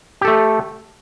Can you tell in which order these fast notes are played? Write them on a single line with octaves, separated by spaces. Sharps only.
G4 A4 A3